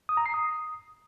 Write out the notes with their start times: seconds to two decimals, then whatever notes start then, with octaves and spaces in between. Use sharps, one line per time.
0.09 D#6
0.17 A#5
0.26 C7
0.34 D#6